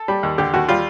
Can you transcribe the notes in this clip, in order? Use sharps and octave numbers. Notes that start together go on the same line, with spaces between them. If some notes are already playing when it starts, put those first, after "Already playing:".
Already playing: A4
G3
D#2
D3 G4
D#2 F#4
G3 F4